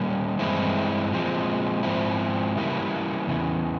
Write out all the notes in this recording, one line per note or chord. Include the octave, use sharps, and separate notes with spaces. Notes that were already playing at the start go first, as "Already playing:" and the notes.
Already playing: A#2 G3 A#3 C#4
G2 E3 G#3 C4 E4
A#2 F3 G#3 C4
G#2 F3 C4 E4
C#3 E3 G3 A#3 E4
E2 C#3 E3